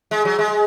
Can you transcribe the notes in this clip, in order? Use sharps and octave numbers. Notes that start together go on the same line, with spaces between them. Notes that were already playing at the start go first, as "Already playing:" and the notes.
G#3
F#3
G#3